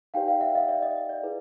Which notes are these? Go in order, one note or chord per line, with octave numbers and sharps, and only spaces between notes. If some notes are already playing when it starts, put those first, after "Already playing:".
D#4 G4 B4 D5 F5 G5
F5 G5
E5 F#5
D#5 F5
D5 E5
D#5
D5
E4 G#4 B4